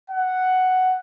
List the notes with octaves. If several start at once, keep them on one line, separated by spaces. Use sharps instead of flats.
F#5